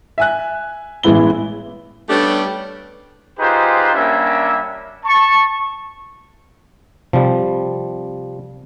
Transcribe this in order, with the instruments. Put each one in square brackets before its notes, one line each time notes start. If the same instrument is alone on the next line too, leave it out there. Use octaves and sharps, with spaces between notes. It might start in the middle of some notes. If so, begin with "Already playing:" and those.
[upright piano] E5 G#5 F#6
A1 E3 G#3 B3 E4 G7
[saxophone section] G3 A3 B3 C#4 D4 G4
[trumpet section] D#4 F4 G4 G#4 B4 C5
G3 A#3 C#4 D4 E5
A5 C#6
[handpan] C3 [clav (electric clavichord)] F3 G3